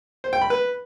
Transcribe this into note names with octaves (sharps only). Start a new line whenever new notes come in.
C5
G5
B5
B4